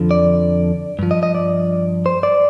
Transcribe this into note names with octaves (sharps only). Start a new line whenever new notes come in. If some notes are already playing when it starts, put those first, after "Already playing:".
Already playing: F2 D3 F3
D5
G2 F3
D#5
D#5
D5
C5
D5